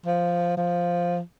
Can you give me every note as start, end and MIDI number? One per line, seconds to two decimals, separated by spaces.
0.06 0.55 53
0.57 1.19 53